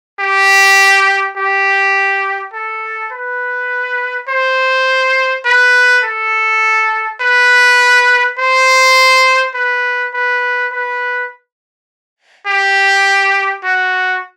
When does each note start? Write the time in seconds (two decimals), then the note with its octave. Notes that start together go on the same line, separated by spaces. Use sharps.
0.20 G4
1.37 G4
2.53 A4
3.13 B4
4.29 C5
5.45 B4
6.04 A4
7.21 B4
8.39 C5
9.55 B4
10.14 B4
10.72 B4
12.47 G4
13.64 F#4